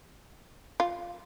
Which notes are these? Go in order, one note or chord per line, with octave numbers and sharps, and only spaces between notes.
F4